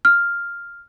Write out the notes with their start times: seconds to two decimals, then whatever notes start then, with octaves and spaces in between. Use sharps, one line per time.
0.05 F6